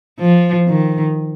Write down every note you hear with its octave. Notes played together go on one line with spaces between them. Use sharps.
F3
D#3